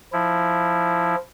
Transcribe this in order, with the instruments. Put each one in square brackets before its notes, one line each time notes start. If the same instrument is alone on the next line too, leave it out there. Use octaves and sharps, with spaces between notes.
[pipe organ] F3 E4